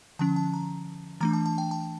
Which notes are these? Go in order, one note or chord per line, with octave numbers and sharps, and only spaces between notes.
D3 F3 C#4 A5
A5
A#5
E3 A3 D4 A#5
A5
A5
G5
A5